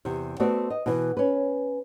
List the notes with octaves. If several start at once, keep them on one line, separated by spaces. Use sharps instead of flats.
E2 C3
A3 B3 C4 F#4 D5
D#5
B2 E3
C#4 B4